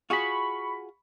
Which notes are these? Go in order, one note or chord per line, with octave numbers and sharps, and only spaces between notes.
F4 F#4 G#4 B5 C#6